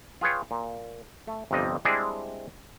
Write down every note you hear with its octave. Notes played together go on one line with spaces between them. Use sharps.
F4 G#4 B4 C#5 G5
A#2
A3
G1 F2 C3 G3 D#5
G3 G#3 C4 D4 E4 G#4